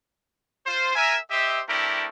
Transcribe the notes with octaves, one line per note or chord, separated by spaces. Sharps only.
F4 C5
A#4 E5 G#5
G4 C5 D#5 E5
A3 C4 D4 E4 G4 A#4